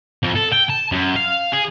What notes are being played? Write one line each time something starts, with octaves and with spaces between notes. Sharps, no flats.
F2
A4
G5
A5
F#2
F5
G#4